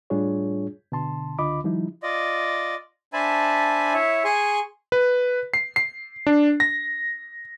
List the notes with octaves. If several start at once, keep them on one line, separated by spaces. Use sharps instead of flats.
A2 G3 D4 F4 G#4 C#5
B2 D3 A5 C6
C#2 D3 F4 D#5 B5 D6
D#3 F3 G3 D#4 E4
F4 D5 D#5
D4 C5 E5 G#5 A5 B5
E4 C#5 E5
G#4 G#5 C6 C#6
B4
C7
C7
D4
A#6